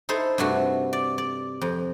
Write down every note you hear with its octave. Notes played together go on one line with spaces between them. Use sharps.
D#4 E4 A4 C5 E5
G2 C3 A3 F#4
D5
D5
F2